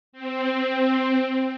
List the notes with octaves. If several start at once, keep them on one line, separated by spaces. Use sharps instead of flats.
C4